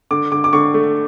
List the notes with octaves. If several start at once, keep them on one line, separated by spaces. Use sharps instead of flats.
D3 D6
D3 D6
D6
D3 C#6
A3